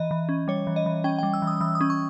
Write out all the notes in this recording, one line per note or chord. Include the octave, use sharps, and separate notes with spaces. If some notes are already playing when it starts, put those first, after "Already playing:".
Already playing: E3 D#5
E3
C#4
G3 C#5
E3
D#5
E3
C#4 G5
G3 G5
E6
E3
D#6
E3 E6
D#6
C#4
C#6